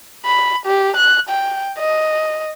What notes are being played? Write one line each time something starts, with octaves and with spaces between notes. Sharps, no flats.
B5
G4
F#6
G5
D#5